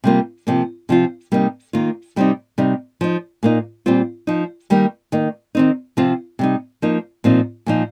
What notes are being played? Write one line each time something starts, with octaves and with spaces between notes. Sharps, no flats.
C3 G3 A#3 F4
C3 F3 A#3
C3 F3 C4 F4
C3 G3 A#3 D#4
D#3 A#3 F4
C3 G3 C4 D#4
C3 G3 D#4
F3 D#4
A#2 A#3 D#4
A#2 G3 C4 F4
F3 D#4
D#3 G3 A#3 D#4
D#3 A#3 D#4
D#3 C4 D#4
C3 F3 C4 F4
C3 G3 D#4
F3 A#3 D#4
A#2 F3 C4 D#4
A#2 F3 D#4